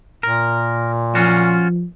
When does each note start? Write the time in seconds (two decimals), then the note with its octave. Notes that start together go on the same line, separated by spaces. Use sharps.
0.23 A#2 A#4
1.15 F3 C#4 F4 F#4